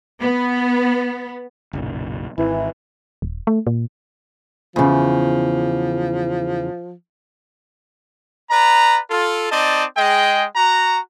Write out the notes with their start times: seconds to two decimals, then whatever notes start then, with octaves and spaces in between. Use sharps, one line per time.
0.20 B3
1.73 F#1 B1 A#2
2.38 G#1 E3
3.22 D#1
3.47 A3
3.67 A#2
4.76 E2 C#3 F3
8.50 B4 D5 A#5
9.10 F4 A4
9.50 C4 D#4 D5 D#5 A5
9.97 G#3 G#4 D#5 G5
10.56 F#4 A#5